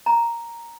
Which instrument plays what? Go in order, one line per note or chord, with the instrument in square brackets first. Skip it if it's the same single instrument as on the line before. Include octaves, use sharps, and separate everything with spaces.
[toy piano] A#5